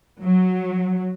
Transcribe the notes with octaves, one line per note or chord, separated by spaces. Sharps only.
F#3